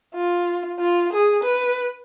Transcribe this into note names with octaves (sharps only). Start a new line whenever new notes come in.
F4
F4
G#4
B4